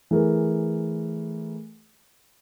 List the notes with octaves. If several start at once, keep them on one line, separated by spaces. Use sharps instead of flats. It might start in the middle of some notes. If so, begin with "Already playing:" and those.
E3 A3 G#4 A#4